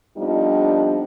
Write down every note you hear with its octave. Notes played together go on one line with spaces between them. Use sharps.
F2 F3 G3 B3 D4 D#4